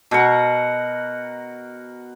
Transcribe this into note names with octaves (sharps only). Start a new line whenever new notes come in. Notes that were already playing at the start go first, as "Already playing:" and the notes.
B2 A#4 F#5